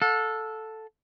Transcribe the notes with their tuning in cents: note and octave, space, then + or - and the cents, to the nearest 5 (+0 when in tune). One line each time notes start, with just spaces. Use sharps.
A4 +0 F#5 -45